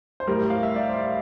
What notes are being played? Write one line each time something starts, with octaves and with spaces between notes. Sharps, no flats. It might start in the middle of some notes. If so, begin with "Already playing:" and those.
C5
A2 G3 A#4
F5
E5
D5
C5